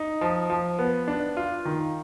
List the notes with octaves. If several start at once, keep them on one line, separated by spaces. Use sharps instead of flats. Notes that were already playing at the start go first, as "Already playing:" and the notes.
Already playing: D#4
F3
F3
B3
D4
F4
D#3